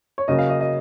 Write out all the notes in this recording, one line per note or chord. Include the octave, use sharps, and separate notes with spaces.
C#5
C#3 F#3 A#3 C#4 D#5
F5
D#5
D#5